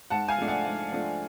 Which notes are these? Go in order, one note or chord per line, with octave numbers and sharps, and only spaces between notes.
G#2 F#5 A5
F5 G#5
F3 A3 D4
D5 F#5
G#2
F3 A3 D4